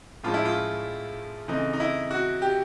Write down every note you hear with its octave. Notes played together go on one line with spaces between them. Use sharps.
A2 F3 G#3 C#4 F4
E4
F4
C#3 E3 A3 C4 D#4
D#4
E4
F#4
G4